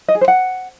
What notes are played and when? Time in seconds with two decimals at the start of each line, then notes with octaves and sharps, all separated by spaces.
0.08 D#5
0.15 G#4
0.21 C5
0.28 F#5